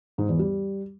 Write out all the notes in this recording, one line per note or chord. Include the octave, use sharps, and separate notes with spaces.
G#2
E2
G3